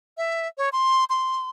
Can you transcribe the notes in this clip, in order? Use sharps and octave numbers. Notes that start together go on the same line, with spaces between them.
E5
C#5
C6
C6